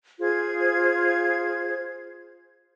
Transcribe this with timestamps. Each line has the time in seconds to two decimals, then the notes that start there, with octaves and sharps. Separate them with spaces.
0.20 F4 G#4 C5 G#6